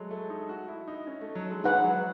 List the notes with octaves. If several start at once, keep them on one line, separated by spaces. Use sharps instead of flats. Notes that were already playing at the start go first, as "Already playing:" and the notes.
Already playing: F#3 G#3 A3
A3
D#4
F#4
E4
D#4
C#4
A3
F#3
G#3
G#3 D#4 G#4 B4 F#5
F#3